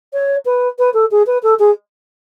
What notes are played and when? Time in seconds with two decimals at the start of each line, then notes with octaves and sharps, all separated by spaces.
0.13 C#5
0.46 B4
0.79 B4
0.94 A4
1.11 G#4
1.27 B4
1.43 A4
1.59 G#4